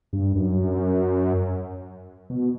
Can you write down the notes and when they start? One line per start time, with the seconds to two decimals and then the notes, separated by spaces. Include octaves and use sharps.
0.13 G2
0.35 F#2
2.30 B2